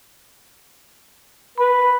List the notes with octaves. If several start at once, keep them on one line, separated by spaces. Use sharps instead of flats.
B4 B5